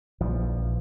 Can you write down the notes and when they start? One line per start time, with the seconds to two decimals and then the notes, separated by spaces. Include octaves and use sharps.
0.21 A#1 E3 F3